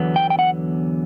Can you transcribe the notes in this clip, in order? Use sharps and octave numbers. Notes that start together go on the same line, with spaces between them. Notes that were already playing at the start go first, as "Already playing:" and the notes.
Already playing: E2 D3 F#3 B3
G5
G5
F#5